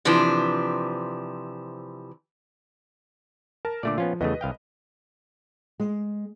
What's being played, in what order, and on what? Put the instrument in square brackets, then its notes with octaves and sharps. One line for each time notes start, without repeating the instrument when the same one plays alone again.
[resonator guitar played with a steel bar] C3 E3 F3 D4
[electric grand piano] A#4 A5
[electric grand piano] A#2 D6 [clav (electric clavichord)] D3 A3 D5
[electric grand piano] F3 [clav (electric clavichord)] B3 C#4 F4
[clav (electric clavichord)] E2 C#3 A3 [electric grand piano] B4 D#5
[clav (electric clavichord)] C2 F5 G5
[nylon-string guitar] G#3